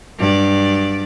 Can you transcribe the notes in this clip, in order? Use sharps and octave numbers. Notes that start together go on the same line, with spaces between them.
G2 F#3 D5